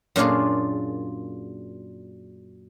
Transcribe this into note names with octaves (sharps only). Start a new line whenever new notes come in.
F#2 A#2 D4 F4 G#4